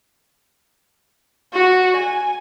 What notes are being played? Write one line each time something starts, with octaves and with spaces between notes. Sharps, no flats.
F#4
G#5